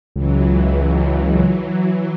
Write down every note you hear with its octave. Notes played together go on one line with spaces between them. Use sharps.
C#2 E3 F#3